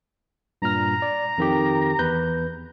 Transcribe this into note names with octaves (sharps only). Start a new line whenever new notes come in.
G2 A#2 A#5 F6
D5
F2 D#3 G4
E2 B4 G6